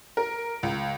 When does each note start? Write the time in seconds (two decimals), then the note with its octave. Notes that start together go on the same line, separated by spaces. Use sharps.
0.17 A#4
0.63 C#2